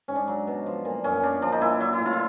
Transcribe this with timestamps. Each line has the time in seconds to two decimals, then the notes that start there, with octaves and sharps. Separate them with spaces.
0.08 G#2 C#4
0.16 D4
0.28 F#3
0.47 B2
0.66 F3
0.85 A#2
1.04 F#2 C#4
1.23 F#2 D4
1.42 F3 D4
1.52 D#4
1.61 A#2 E4
1.80 F#3 E4
1.93 E4
2.00 A2
2.06 F4
2.13 E4